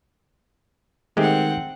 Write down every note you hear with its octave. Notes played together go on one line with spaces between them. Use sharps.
D#3 G#3 A3 C4 G4 F#5